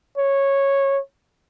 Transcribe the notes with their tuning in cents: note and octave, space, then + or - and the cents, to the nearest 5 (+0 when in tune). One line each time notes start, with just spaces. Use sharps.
C#5 -10